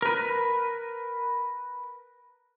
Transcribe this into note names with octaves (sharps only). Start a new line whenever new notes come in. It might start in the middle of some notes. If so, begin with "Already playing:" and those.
A#4 B4